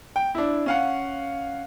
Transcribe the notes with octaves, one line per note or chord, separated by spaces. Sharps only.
G5
D4 E4
C#4 F5 F#5